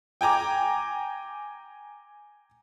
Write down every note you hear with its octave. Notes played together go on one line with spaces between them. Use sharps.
G5 G#5 A#5 D6